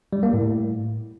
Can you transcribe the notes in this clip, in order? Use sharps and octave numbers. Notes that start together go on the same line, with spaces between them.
G3
A#3
A2